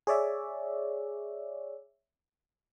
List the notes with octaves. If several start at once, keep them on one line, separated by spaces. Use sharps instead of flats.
G#4 C#5 D5 E5